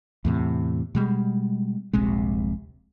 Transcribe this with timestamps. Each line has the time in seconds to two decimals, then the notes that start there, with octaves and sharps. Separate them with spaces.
0.25 E2 A2 C3
0.95 B2 G3 G#3
1.93 D#1 A#1 C3 G#3